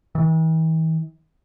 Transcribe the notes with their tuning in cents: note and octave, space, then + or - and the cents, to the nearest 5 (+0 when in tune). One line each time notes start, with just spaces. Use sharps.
E3 -45